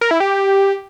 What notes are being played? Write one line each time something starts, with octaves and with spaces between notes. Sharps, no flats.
A#4
E4
G4